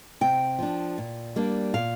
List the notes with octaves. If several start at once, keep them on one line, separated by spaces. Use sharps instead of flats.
C3 G5
F3 D4
A#2
G3 A#3 D4
A#2 F5